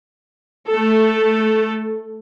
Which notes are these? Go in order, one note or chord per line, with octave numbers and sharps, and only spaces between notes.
A3 A4